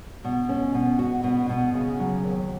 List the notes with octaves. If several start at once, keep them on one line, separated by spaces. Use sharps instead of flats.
B2
C#4
B2
F#4
B2
B2
C#3
F#3
D#2